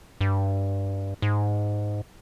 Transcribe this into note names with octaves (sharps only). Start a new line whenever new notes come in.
G2
G#2